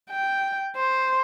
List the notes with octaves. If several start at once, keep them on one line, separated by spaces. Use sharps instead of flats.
G5
C5